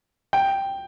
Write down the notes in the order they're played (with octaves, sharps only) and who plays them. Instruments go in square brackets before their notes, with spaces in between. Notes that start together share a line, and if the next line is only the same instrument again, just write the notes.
[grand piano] G5